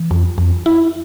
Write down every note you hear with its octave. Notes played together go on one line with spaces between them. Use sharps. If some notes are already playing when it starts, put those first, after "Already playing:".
Already playing: E3
F2
F2
E4